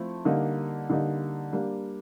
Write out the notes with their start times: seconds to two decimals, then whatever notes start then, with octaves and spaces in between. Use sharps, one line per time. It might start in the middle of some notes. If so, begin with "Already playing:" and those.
Already playing: F3 A3 C4 E4
0.25 D3 G3 A#3 D#4
0.90 D3 G3 A#3 D#4
1.52 G3 A#3 D4